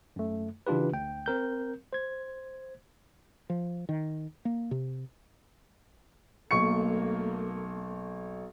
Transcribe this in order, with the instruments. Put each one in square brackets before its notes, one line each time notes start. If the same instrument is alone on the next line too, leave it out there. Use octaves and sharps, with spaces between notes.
[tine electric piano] F#2 A3
C#3 E3 D4 F4 G4 B4
D2 G5
C4 A#4 G6
C5 G#6
[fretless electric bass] F3
D#3
A#3
C3
[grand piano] B1 C#6 C#7 [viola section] A3 A#3